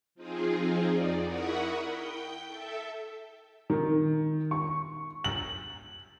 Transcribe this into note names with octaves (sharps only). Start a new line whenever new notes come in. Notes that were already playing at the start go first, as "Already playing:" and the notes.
F3 C4 D#4 F4 G#4
F2 D#4 D5
E4 A#4 F#5 B5 C#6 D#6
G5 G6
A4 E5
D#3
C#6
F#7